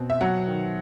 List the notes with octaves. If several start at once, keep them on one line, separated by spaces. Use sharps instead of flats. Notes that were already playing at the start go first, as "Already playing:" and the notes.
Already playing: B2 C4
E5
F#3 F#5
D#3